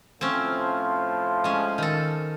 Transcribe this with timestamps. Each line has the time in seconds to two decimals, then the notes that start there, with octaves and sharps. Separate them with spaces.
0.21 A2 F3 C4 C#4
1.44 G#3 C#4
1.78 D#3 A4